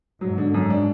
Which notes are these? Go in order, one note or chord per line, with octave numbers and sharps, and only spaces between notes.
G#2 F#3
D3
F#2
D4